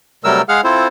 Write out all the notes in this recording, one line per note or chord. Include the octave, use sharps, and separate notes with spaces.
C3 F#3 G3 A3 A#4 E6
G#3 G#4 F5 F#5 F6
C4 E4 F4 A4 C5